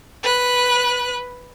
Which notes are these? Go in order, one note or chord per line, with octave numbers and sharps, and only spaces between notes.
B4 F#6